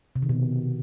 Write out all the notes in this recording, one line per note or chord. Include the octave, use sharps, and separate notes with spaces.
C3
D#3
B2